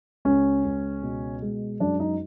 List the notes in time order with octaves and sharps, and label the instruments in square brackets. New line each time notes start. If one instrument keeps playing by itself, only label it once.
[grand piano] C#2 C#4
C#2
B2
G#3
F#2 D4
D#4